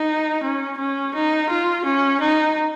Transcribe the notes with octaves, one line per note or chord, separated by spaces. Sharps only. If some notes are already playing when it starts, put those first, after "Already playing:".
Already playing: D#4
C#4
C#4
D#4
F4
C#4
D#4